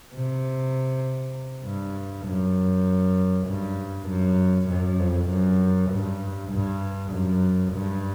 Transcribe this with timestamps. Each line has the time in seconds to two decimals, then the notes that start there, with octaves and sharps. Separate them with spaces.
0.13 C3
1.65 G2
2.26 F#2
3.47 G2
4.08 F#2
4.69 F#2
5.00 F2
5.29 F#2
5.90 G2
6.51 G2
7.12 F#2
7.73 G2